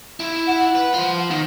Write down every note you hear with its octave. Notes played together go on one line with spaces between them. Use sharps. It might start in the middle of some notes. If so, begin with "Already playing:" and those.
E4
F#5
B4
F4 C5
D#3